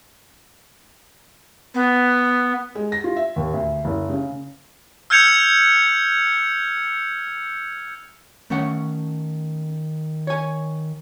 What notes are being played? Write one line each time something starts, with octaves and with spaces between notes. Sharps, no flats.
B3
G#3
A#6
F4
E5
D#2
D2
F#1
C#3
E6 F6 G6 G#6 C#7 F7
D#3 A3 C#4 F#5
C#5 G#5